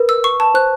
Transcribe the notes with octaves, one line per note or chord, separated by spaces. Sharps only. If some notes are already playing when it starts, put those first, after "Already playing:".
Already playing: A#4 B4
E6
C#6
A5
C5 F#6